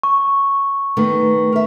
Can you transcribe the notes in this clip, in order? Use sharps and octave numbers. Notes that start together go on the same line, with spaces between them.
C#6
D#3 A3 B3
A#4 E5